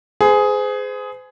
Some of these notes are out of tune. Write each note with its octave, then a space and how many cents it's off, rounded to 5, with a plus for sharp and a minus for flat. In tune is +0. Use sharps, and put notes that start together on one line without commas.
G#4 +10 C5 -40